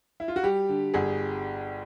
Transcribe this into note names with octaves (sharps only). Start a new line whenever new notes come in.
E4
F4
F#4
G3 G4
D3
G1 G#4